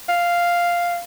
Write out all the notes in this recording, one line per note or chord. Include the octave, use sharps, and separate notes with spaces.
F5